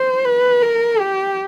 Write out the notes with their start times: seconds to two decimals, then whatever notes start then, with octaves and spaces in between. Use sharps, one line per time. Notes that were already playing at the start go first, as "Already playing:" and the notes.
Already playing: C5
0.24 B4
0.62 A#4
1.00 G4